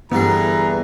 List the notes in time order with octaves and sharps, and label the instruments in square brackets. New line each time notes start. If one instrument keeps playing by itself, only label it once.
[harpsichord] G2 D3 G3 [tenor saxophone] E3 [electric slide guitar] B3 G#4 [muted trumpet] A#5